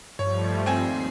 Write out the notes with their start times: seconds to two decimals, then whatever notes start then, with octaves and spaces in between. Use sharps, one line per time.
0.19 G2 F3 G3 A3 C#5
0.66 D#2 C4 G#5 C7